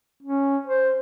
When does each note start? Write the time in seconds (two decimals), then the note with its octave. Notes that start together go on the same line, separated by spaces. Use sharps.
0.23 C#4
0.67 C5